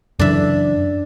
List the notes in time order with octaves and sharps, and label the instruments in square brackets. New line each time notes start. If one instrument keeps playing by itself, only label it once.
[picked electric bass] F#2 C#3 E3 [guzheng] D4 E5